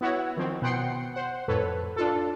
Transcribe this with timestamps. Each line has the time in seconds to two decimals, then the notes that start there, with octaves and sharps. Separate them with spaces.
0.01 B3 E4 F#4 C#5
0.36 D#3 F3 C4
0.62 B2 F#5 G5 C6 C#7
1.14 C5 F#5
1.48 F2 A2 A4 B4 C#5
1.96 D4 F4 A4